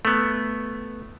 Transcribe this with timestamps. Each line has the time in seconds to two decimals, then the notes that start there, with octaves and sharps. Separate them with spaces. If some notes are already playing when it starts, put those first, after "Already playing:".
0.05 A3 B3